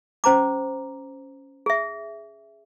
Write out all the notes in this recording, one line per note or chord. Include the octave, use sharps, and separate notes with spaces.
C#4 C5 A#5 D6
G#4 E5